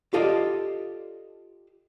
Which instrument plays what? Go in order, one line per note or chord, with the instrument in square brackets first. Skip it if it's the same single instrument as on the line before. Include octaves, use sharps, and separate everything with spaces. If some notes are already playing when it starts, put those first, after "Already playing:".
[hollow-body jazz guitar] F4 G4 A4 D5 D#5 F5